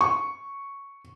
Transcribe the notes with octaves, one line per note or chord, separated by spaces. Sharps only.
C#6